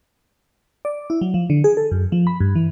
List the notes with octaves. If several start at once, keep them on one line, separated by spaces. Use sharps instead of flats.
D5
E4
F#3
F3
D3
G#4
A4
F#2
F3
B5
G2
E3